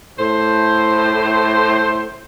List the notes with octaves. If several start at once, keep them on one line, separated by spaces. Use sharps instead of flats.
A2 C5